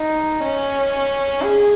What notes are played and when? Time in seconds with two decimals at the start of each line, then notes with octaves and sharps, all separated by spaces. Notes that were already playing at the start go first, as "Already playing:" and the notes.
Already playing: D#4
0.43 C#4
1.42 G#4